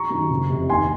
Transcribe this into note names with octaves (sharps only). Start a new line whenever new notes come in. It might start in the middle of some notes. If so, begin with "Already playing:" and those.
Already playing: A#5 C#6
F#2 D#3
F#1
F2 C3
D#2 G#5 C6